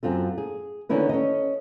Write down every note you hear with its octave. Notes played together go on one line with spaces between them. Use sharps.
F#2 C4 F4 A4
G#4
D3 D#3 C#4 E4 B4
C#4 A4 D#5